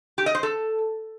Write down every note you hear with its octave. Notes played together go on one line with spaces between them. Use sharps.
G4
D#5
C5
A4